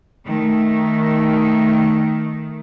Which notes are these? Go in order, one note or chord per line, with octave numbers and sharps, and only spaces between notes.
D#3 A3